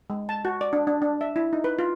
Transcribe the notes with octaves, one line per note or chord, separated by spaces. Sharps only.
G#3
A5
F#4
D5
D4
D4
D4
E5
E4
D#4
B4
F4